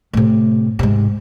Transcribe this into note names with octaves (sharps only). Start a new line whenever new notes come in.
A2 C3
G#2 C3